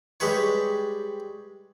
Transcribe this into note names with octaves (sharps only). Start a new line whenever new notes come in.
G3 G#3 G4 B4 C#5